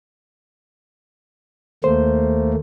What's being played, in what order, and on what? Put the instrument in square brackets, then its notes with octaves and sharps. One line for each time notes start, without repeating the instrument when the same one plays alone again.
[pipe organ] D#2 A3 A#3 [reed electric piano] C5